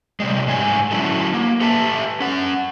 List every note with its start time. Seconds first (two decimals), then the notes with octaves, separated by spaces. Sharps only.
0.20 C3 G3 G#3
0.48 G#2 G#3 A3 C#5 G#5
0.91 D3 F#3 C#4 E4 F#4 A4
1.33 A#3
1.60 G4 A4 B4 E5 A5
2.20 C#4 F#5